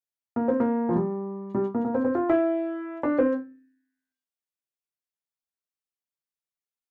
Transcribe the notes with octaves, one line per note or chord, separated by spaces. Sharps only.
A#3
C4
A#3
F3
G3
G3
A#3
A#3
C4
C4
F4
E4
D4
C4